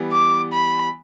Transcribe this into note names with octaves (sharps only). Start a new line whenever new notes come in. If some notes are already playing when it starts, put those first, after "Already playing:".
Already playing: E3 G3 B3
D6
B5